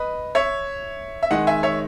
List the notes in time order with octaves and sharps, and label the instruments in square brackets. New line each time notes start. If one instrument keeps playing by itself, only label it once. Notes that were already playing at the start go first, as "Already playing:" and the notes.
Already playing: [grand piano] B4 D#5
C#5 E5
E5
D#3 G#3 D#5 F#5
E5 G#5
C#5 E5